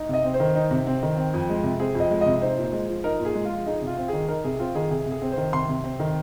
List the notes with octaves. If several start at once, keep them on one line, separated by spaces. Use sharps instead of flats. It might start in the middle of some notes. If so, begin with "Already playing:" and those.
Already playing: D#4
C3 D#5
C4
C5
D#3
D#4
C3
C4
D#3
C4
F2
G#3
C3
C4 G#4
F2
D#5
G#3
C3 D#5
D#4 C5
A#2
G#3
F3
D#4 A#4
A#2
G#4
G#3
F4
F3
D#4 G#4
C3
F4
C4
D#3 G#4
D#4 A#4
C3 G#4
C4 F4
D#3 G#4
C3 G#4
C3
G#4
C4
C5
D#3
C3 C6
C3
C4
D#3